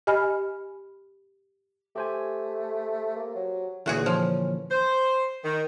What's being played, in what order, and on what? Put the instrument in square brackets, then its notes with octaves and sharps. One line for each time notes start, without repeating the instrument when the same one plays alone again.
[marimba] G4 D#5 G#5 B5 F6
[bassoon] A3 [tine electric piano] G4 C5 G#5
[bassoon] A#3
F#3
[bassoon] C#2 [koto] A#2 F#4 G#4 [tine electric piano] D3 E3 A#3
[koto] F3 [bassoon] C#4
[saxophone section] C5
D#3